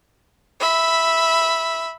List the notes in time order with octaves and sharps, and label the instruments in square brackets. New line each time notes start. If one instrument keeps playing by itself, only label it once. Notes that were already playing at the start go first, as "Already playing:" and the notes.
[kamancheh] E5 B5